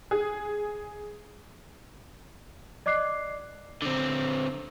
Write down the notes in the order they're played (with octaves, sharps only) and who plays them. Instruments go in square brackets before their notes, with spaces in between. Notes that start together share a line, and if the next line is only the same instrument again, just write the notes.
[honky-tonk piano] G#4
[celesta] D5 D#5 D6 F#6 C7
[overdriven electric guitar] D3 C4